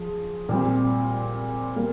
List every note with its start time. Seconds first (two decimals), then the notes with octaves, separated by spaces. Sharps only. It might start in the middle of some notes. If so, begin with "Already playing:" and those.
Already playing: F3 G#4
0.49 A#2 G3 C4
1.76 G3 A#3